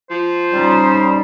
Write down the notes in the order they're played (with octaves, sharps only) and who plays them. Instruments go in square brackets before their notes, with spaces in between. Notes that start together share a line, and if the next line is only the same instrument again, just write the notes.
[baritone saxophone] F3 [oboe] C5
[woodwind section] G3 [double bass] C#4 D#4